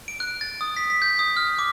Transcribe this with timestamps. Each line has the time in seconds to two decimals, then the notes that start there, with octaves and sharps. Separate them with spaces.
0.08 D7
0.20 F#6
0.41 A6
0.61 D#6
0.77 B6
0.90 B6
1.02 G6
1.19 D#6
1.37 F6
1.59 D6